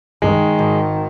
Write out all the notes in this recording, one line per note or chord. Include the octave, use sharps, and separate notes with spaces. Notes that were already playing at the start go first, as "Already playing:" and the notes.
C#2 G2 D#3 G#3
G#1